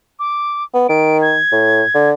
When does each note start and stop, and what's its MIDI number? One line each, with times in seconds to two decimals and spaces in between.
0.19 0.64 86
0.74 0.88 59
0.89 1.39 51
0.89 1.18 98
1.22 2.09 92
1.52 1.83 45
1.94 2.13 50